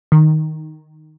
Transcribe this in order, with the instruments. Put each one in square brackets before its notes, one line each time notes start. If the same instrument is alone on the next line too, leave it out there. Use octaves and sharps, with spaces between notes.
[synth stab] D#3